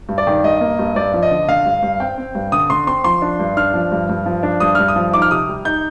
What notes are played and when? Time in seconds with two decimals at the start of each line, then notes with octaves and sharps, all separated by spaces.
0.09 G2
0.18 D5
0.27 D#3
0.44 G2 D#5
0.61 A#3
0.79 G2
0.96 G2 D5
1.14 F3
1.23 D#5
1.31 D3
1.48 D3 F5
1.66 G2
1.83 G2
2.00 C4 G5
2.18 C4
2.35 G2
2.52 D3 D#6
2.70 D3 C6
2.87 C4 C6
3.04 F3 C6
3.22 D4
3.40 G2
3.57 D4 F6
3.74 F3
3.92 G2
4.09 G2
4.26 F3
4.43 D4
4.60 G2 D#6
4.75 G2 F6
4.88 D#6
4.96 F3
5.13 D#4 D6
5.22 F6
5.31 C3 D#6
5.49 G3
5.65 D#4 G6